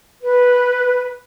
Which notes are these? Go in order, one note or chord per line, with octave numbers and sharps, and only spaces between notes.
B4